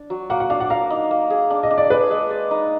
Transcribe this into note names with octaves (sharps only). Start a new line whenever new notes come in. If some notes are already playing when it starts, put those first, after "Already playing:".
Already playing: D4
F#3
A#3 F#5
F#5
D4 F5
F#5
A#4 F5
D#4
A#3
G#4
D4
D#5
D4
D5
G#4 B4
G#3
D5
D#4